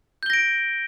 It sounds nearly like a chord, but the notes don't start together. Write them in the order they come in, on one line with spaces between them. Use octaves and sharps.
G6 G7 A#6 D7